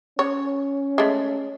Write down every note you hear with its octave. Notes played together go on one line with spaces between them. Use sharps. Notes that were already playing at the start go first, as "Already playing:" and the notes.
C#4 C#5
G#3 A3